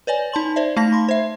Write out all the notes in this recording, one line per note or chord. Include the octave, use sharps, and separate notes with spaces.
B4 C#5 D5 G#5
D#4 A5 C6 F#7
C5 D5 E5
A3 D#4 A5 A#6
B5 C6
C5 E5